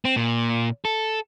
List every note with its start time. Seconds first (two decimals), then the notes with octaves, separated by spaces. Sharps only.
0.05 C4
0.16 A#2
0.85 A4